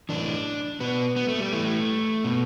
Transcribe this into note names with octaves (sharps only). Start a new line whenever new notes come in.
A2 E3 D4
B2 B3
B3
A3
G3
A2 E3 A3
B2